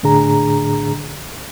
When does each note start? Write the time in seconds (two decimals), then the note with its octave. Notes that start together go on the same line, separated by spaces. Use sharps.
0.03 A2 D3 D4 G#4 A#5